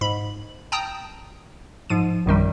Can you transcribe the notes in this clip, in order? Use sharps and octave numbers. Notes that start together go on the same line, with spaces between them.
G#2 B5
G5 A5 A#5 D#6
G#2 F3 D#7
A#1 F#2 D#3 G3